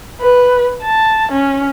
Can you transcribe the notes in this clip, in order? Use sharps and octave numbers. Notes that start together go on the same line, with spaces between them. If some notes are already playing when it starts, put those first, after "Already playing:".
B4
A5
C#4